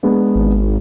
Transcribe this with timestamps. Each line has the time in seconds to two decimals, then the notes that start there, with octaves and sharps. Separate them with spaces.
0.03 G#3 B3 D4
0.35 G#1